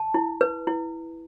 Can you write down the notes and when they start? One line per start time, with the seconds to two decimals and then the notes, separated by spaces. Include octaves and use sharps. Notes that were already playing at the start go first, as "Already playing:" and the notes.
Already playing: A5
0.14 E4
0.41 B4
0.67 E4